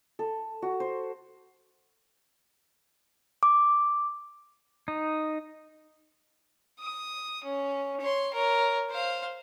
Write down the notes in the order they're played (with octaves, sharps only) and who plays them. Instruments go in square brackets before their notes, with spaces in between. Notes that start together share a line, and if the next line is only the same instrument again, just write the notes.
[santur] A4
F#4
C5
[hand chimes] D6
[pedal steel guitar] D#4
[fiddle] D#6
C#4
C#5 C6
A#4 C#5
C5 F5